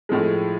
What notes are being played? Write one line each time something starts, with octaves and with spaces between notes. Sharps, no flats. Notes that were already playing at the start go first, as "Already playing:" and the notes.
A2 F3 G#3